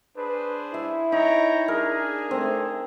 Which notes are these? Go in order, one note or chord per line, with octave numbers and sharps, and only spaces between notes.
D4 G#4 B4 C5
E4 E5
D#4 C#5 G5 A#5
D4 G#4 A#4
A3 C4